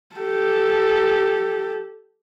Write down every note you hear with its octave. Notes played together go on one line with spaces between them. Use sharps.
G4 A4